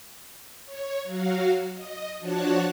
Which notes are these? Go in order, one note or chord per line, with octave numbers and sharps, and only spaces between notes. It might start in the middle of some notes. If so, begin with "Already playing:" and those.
C#5
F#3 F#4 F5
D#5
F3 D4 F#4 C#5 A5 F#6